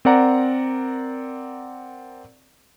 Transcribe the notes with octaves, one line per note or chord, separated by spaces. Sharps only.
C4 A#4 D5 F#5 A#5